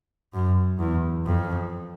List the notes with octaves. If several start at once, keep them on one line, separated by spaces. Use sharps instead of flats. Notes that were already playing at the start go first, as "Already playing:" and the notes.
F#2
E2
F2